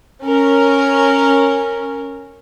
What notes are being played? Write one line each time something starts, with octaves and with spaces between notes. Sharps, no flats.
C#4 A#4